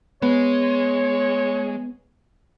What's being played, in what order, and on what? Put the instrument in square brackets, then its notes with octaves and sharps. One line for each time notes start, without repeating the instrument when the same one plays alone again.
[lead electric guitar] G#3 [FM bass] B3 [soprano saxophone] C#5